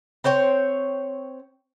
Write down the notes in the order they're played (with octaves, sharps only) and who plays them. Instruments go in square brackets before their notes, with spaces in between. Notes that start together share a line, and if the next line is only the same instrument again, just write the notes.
[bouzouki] C4 C5 C#5 G5